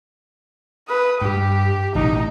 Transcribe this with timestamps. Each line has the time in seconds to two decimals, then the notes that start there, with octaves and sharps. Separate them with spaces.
0.88 B4 D#6
1.21 G2 G4
1.95 A1 B2 D#4